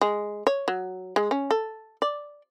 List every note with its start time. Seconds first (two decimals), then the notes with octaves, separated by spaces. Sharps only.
0.01 G#3
0.47 C#5
0.68 F#3
1.16 G#3
1.31 C#4
1.51 A4
2.02 D5